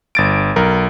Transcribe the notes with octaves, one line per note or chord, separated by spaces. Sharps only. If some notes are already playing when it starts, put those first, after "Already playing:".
G1 A6 D7
B1 A#4